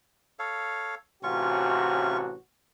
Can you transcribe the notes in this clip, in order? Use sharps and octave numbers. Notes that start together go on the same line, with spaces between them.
A4 C#5 F5
A1 C3 C#4 F4 F#4 C#6